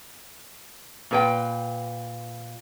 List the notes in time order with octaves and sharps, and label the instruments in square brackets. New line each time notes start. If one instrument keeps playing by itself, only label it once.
[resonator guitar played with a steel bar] A#2 B4 G5